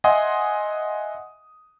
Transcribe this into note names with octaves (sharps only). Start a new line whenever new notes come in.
D#5 E5 F#5 G#5 C6 D#6